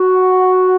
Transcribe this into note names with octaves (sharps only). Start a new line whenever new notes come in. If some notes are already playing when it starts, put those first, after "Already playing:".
Already playing: F#4